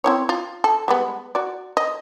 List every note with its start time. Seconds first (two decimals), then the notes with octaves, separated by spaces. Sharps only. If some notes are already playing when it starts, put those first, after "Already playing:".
0.04 C4 E4 C#5
0.29 F4
0.64 A4
0.88 G3 G#3 B3
1.35 F#4 D5
1.77 D#5